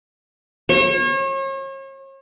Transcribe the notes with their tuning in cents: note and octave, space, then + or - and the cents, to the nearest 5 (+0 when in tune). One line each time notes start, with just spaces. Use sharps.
C#5 -40